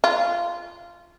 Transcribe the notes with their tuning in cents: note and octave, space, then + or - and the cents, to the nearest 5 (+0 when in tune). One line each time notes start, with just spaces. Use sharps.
F4 -10